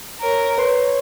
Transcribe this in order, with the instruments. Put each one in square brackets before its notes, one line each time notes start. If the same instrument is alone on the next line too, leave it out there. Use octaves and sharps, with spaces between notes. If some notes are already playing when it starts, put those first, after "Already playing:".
[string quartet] A#4 C#5
[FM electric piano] B4 C6 [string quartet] C#5